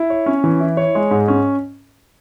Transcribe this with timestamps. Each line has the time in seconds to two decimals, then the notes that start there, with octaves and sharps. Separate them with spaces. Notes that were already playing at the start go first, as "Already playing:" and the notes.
Already playing: E4
0.10 C#5
0.26 C#4
0.44 E3
0.60 E4
0.77 C#5
0.95 G#3
1.11 G#2
1.28 C#4